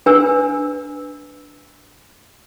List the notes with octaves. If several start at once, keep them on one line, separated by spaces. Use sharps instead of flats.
D4 B4 G#5 E6